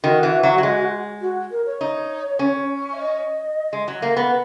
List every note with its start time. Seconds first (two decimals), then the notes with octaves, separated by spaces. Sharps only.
0.04 D#3 F#4
0.23 E3
0.43 F#3
0.58 F#3
0.63 G#3
1.21 F#4
1.51 A#4
1.66 C#5
1.81 D#4
2.39 C#4
2.93 E5
2.99 D#5
3.73 G#3
3.88 F#3
4.02 A#3
4.17 B3